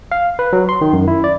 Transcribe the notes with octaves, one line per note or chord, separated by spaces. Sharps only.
F5
B4
F#3
C6
D#3
F#2
E4
D5